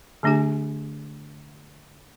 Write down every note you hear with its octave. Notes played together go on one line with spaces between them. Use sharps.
D3 A3 D4 G4 G#5